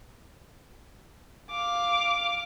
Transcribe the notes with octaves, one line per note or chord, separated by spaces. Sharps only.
F5 D6